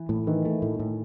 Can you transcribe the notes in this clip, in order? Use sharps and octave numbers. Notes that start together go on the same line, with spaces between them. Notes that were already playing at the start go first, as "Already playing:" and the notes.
Already playing: E3
A2
D#3 E3
A3
A2
A2